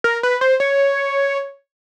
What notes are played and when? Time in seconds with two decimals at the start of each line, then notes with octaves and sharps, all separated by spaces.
0.04 A#4
0.23 B4
0.41 C5
0.60 C#5